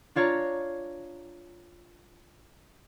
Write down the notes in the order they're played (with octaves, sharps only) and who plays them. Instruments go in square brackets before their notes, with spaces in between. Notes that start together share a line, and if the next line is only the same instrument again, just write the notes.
[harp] D4 F4 C#5 D5 A#5